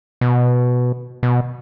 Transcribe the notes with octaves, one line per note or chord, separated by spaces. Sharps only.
B2
B2